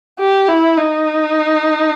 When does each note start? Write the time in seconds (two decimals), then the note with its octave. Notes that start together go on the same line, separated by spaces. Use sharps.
0.19 G4
0.48 E4
0.77 D#4